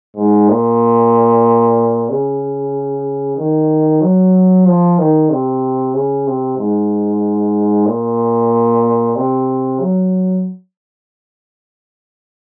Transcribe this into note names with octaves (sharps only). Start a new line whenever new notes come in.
G#2
A#2
C#3
D#3
F#3
F3
D#3
C3
C#3
C3
G#2
A#2
C3
F#3